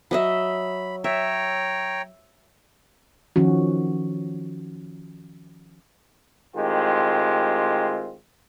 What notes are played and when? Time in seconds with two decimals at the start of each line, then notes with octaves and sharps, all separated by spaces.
0.11 F#3 D#5 E5 B5
1.04 C#5 E5 G5 A#5
3.36 D#3 F3 C#4 F#4
6.56 A2 D#3 G#3 C4 F4 G4